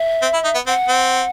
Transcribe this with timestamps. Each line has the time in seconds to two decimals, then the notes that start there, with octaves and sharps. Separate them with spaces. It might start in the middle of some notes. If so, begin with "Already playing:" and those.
Already playing: E5
0.22 C4
0.34 E4
0.44 D#4
0.55 B3
0.67 C4 F#5
0.88 C4